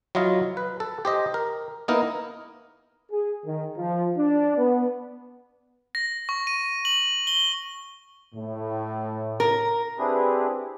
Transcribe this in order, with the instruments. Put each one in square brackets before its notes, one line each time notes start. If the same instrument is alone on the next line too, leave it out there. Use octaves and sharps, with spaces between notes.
[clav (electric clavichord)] F#3 E4 F4 D#5 F5
B4
A4
G4 C5 D#5
A#4
A#3 B3 D#4 E4 A#4
[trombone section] G#4
D#3
F3
D4
B3
[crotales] A#6
C#6
D#7
F#7
G7
[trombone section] A2
[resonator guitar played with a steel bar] A#4
[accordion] C4 D4 E4 G4 G#4 B4